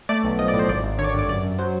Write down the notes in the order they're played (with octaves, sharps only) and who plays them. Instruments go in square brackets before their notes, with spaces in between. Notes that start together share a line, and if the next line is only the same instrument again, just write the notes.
[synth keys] A3 D5
B1
F3 D#5
D5
A2
C5
G#1 D5
G#1
D3 C#5
D5
C#5
G2 D5
F#2 D5
F#2
F#3 C5